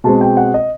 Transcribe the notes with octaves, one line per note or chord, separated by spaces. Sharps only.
B2 G#3 C4 A5
G5
F#5
D#5